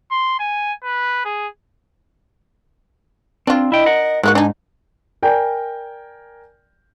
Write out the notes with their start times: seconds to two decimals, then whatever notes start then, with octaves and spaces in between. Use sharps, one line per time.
0.11 C6
0.40 G#5
0.84 B4
1.25 G#4
3.47 C4 D4 F4
3.72 E4 D#5 G5
3.86 A#4 F#5
4.23 G#2 G#3 A#3 F#4 F#6
4.35 D4 D#4 G#5
5.23 A#4 D5 G5 G#5 G6